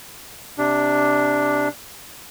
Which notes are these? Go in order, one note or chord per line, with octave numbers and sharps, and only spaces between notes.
C3 D4